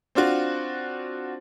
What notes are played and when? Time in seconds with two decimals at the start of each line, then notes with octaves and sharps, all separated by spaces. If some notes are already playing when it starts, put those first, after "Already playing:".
0.15 C4 D4 F4 F#4